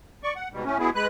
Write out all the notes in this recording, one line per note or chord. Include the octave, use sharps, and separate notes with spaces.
D5 C#6
F#5
G#2 B2 G3
A2 A3 C#4
B2 B3 E4 G#4
G#3 B4 F#6